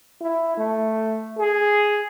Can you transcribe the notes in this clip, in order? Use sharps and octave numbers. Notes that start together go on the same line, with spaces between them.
E4
A3
G#4